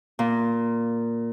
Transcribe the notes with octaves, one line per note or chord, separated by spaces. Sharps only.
A#2